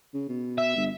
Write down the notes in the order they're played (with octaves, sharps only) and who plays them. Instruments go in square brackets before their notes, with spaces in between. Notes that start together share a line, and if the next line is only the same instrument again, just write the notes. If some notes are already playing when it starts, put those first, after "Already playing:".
[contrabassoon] C#3
B2
[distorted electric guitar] E5
[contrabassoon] G1